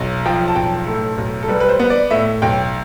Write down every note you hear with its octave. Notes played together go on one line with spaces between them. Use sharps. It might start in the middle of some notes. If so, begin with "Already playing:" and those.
Already playing: B1
F3 G5
A5
B1 G5
A2 A4
B1
A4
G3 B4
B4
C5
B3
D5
A2 E5
B1 G5